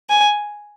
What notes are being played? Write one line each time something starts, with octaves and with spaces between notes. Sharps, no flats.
G#5